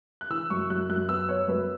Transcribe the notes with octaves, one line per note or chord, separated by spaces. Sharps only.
F#6
E3 E6
F#2 C#6
F#2 F#6
F#2 F#6
B3 E6
B3 C#5
F#2 B4